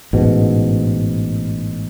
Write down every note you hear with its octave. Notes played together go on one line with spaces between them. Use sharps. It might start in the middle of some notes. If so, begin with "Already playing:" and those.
A1 G#2 B2